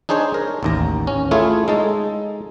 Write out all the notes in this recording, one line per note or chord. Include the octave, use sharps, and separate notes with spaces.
D4 D#4 G#4 C5 C#5
A#4
A1 D#2 A#5
C#4
A3 E4 F4 G#4 C#5
G#3 D#4 A4